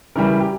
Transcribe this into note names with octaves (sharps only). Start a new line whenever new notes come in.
C#3 E3 G3 A#4
G4